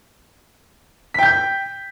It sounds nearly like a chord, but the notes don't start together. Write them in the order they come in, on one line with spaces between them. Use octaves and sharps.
B6 G5 G6